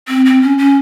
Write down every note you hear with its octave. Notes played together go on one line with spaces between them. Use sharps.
C4
C4
C#4
C#4